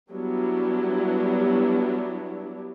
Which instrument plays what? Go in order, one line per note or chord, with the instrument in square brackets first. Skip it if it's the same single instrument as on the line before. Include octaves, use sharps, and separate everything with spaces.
[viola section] F#3 G3 B3 D4 E4